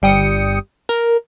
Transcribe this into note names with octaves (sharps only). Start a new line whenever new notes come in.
G1 G3 G5 D#6 C#7
A#4